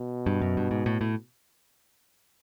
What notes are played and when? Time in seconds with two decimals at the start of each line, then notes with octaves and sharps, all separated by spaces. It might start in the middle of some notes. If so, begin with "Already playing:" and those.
Already playing: B2
0.26 G2
0.41 F#2
0.57 G2
0.71 G#2
0.86 A2
1.01 A2